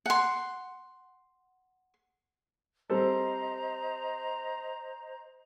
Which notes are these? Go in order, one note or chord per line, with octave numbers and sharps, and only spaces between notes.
F#5 C6
G3 C4 A4 C5 D#5 A#5